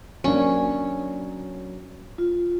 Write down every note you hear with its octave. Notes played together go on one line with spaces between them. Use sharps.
F#3 A#3 C#4 D4
F4